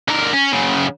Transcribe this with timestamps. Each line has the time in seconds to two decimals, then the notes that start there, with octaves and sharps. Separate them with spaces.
0.08 D3 A#4
0.33 C#4
0.53 F#2 C#3